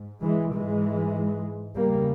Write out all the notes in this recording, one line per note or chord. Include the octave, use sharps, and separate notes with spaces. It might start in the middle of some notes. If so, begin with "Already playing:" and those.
Already playing: G#2
E3 G#3
G#2 E3 G#3
E2 C#3 G3 A#3